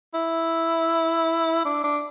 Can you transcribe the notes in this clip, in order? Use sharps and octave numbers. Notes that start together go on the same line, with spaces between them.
E4
D4
D4